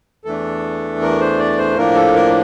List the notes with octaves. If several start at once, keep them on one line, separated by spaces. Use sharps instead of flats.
E2 E3 A3 D4 A4
A#4
C5
D5
C5
A2 F3 A#3 D4 A#4
A4
A#4